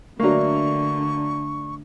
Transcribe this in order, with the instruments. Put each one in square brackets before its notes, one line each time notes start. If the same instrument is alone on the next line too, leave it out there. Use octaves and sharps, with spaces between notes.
[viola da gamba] D3 [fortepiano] F#3 A#3 [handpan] A3 D4 [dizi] C#6